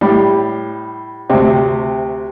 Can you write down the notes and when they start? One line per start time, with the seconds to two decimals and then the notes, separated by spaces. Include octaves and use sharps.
0.01 A2 G3
1.30 D2 C3